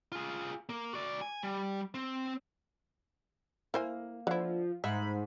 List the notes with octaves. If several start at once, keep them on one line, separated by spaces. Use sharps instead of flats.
F4 G#4
A#3
F#4 D5
G#5
G3
C4
A#3 E4 C5 G#5
D3 F3 E4
G#2 E5 B5